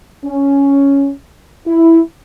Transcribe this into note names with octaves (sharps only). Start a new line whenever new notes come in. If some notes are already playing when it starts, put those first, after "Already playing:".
C#4
E4